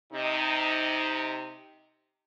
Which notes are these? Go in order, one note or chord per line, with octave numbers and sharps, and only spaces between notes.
C3 D#4